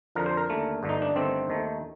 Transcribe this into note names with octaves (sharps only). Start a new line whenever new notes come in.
F2 D3 F3 A#4
C5
A#4
D#2 D3 A3
G1 G2 D3 A3
D#4
D4
G1 G2 D#3 A3 C4
D#2 D#3 A3